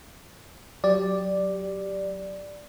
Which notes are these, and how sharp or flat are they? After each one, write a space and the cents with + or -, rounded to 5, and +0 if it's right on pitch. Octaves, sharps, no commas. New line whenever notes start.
F#3 +0 G4 +0 D5 +0